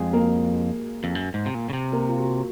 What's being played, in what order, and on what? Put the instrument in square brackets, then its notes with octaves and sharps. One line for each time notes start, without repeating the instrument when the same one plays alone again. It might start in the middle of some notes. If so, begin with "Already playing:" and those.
Already playing: [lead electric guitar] F2 [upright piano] G#3 G#4
[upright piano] A#3 A#4
[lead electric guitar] F2
F#2
G#2
C3
A#2
C#3
C3
[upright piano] A#3 A#4
F4
F#4